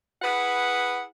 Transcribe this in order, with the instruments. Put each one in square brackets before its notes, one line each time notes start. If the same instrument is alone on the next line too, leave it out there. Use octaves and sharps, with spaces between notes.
[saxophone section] E4 G#4 B4 F#5